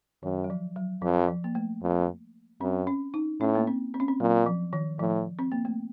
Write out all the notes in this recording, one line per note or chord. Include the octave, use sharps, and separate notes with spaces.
F#2 D#3
F#3
F3
F#3
F2 F3
F3
A#3
A3
F2
F#2 C4
C#4
D#4
A2 C#4
A#3
C4
C4
C#4
C4
A#2 F#3
F3
D#3
A2 F3
C4
A#3
A3